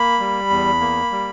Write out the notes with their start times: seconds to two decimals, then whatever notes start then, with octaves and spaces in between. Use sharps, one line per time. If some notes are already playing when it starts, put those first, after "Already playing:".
Already playing: A#3 B5
0.20 G3
0.50 E2
0.81 A#3
1.11 G3